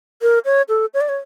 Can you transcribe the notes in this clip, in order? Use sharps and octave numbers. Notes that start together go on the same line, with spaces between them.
A#4
C#5
A4
C#5
D5
C#5